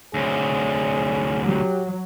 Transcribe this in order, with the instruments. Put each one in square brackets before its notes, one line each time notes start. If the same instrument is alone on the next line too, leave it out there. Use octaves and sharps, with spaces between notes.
[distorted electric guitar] D2 C3 [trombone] G#4 [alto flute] C#5
[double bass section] F#3 [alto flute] G4